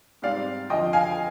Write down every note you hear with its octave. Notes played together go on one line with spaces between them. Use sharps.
G#2 G3 C4 D5 F5
F2 D3 F3 D#5 G5
F5 G#5